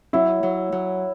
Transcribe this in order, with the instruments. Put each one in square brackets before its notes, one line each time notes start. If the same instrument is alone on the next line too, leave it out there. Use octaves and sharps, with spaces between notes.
[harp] F#3 [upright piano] E4
[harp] F#3
F#3